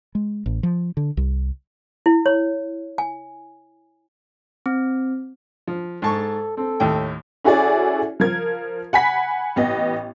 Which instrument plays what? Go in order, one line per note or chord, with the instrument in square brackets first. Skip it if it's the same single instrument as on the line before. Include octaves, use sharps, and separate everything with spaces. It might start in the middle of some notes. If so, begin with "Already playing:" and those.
[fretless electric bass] G#3
A1
F3
D3
C2
[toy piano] E4
C#5
G#5
[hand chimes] C4
[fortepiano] F3
[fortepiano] G#2 A5 C#6 [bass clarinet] A4
[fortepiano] C4 [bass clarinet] A4
[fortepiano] D#2 A2 G5
[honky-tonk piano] C#4 E4 F#4 G#4 A4 D5
F3 A#4 G#6
F#5 G#5 B5 B6
A1 B3 D#5